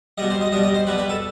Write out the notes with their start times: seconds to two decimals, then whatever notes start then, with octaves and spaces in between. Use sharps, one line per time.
0.18 B2 G3 D#5
0.30 C5
0.41 D#5
0.52 B2 G3 D#5
0.63 D#5
0.74 C5
0.87 B2 G3 B4
0.98 B4
1.09 A4